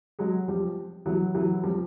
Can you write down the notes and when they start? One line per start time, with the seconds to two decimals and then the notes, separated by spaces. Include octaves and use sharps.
0.19 F#3 G#3
0.48 F3 G3
1.06 E3 F#3
1.34 E3 F#3
1.63 F3 G3